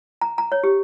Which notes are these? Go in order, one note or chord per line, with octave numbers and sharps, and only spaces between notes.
A#5
A#5
C#5
G4